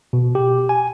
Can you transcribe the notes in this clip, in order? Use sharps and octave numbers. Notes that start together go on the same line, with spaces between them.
B2
G4
G#5